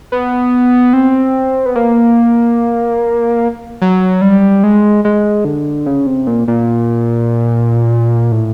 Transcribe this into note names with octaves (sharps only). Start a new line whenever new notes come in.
B3
C4
B3
A#3
F#3
G3
G#3
G#3
D3
C#3
C3
A#2
A#2
A2